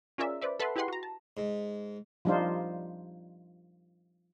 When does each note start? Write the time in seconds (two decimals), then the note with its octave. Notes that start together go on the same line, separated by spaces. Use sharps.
0.18 C#4 F4 G#4 A#4 D5 E5
0.42 B4 C5 D5 E5
0.60 A4 B4 E5 F#5 A5 C6
0.76 E4 G4 G#4 B4 F#5 C6
0.88 F#4 A#5
1.03 A5
1.37 G#2
2.25 F3 G3 D4 D#4 F4 C5